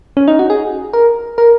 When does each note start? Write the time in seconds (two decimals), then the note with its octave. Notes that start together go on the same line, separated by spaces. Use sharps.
0.17 C#4
0.28 D#4
0.39 F#4
0.50 G#4
0.93 A#4
1.38 A#4